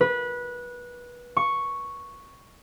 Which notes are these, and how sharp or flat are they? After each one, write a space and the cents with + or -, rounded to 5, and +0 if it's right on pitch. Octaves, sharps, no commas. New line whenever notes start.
B4 -20
C#6 +0